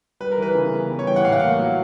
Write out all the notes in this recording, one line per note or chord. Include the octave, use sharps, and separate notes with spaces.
G3 B4
A#4
E3 B4
C#3
B3
G3
C#5
E3 G5
F#5
A2 F5
F#5
A#3 F5
F#3